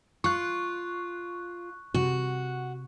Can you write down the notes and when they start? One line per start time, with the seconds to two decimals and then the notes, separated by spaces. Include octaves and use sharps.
0.24 F4 C#6 F#6
1.94 C3 F#4